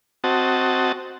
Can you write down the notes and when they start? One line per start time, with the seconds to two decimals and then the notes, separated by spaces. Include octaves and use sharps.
0.24 C4 F#4 D#5 A5